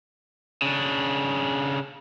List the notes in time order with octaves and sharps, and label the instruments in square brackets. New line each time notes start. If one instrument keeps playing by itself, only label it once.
[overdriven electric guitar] C#3 D4